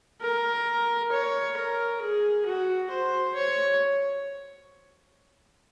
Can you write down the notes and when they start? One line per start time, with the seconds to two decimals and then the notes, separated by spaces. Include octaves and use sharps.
0.21 A#4
1.11 C#5
1.56 A#4
2.01 G#4
2.45 F#4
2.90 C5
3.35 C#5